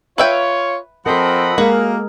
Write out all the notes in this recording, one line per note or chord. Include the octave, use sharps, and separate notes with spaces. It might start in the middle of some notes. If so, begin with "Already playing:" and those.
F4 B4 C#5 E5 G5
F3 C4 A4 A#4 D#5 F#5 B5
G#3 A#3 F#4 G#4 A#4